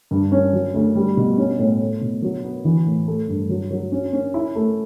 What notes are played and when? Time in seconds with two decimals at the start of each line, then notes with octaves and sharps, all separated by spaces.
0.11 G2
0.32 C#4
0.53 F#3
0.74 D2
0.95 G3
1.17 B2
1.38 C#4
1.59 A2
1.80 A3
2.01 B2
2.22 F#3
2.44 B3
2.65 E3
2.86 A2
3.07 A3
3.28 G2
3.49 F#3
3.71 F#3
3.92 C#4
4.13 C#4
4.34 E4
4.55 A3